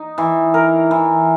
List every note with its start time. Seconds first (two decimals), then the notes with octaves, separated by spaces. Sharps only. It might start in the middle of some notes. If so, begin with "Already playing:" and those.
Already playing: D#4
0.18 E3
0.54 A#4
0.91 E3